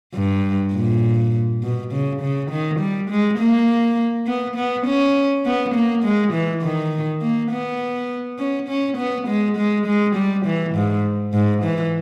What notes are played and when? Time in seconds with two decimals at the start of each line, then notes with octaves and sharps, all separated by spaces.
0.15 G2
0.74 A#2
1.63 B2
1.92 C#3
2.22 C#3
2.51 D#3
2.80 G3
3.10 G#3
3.39 A#3
4.27 B3
4.56 B3
4.86 C#4
5.46 B3
5.75 A#3
6.04 G#3
6.33 E3
6.62 D#3
7.22 A#3
7.51 B3
8.39 C#4
8.69 C#4
8.97 B3
9.28 G#3
9.57 G#3
9.86 G#3
10.16 G3
10.45 E3
10.75 G#2
11.33 G#2
11.63 E3